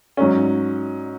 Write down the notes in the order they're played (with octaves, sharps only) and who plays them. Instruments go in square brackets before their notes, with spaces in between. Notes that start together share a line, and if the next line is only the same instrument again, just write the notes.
[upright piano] G#2 F#3 C#4